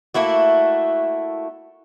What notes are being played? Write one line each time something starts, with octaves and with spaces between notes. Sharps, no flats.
A3 A#3 E4 F#4